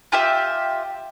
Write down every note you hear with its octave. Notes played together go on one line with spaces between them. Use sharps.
F4 G4 E5